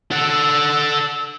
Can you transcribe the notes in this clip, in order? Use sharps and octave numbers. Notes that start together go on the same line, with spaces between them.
A4 F#5 E6